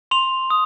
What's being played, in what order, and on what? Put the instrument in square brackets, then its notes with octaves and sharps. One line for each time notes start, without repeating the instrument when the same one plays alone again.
[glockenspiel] C6 F7
D#6